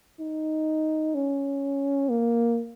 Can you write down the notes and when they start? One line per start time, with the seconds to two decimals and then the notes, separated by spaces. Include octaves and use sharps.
0.20 D#4
1.15 C#4
2.10 A#3